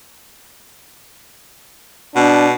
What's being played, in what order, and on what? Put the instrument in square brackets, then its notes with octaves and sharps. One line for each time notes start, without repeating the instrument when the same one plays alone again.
[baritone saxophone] B2 [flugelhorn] D4